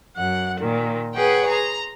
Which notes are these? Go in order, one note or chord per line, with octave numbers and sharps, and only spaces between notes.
F#2 F#5
A#2 D#3
G#4 B4 C#5 F#5 G5
A#5 C6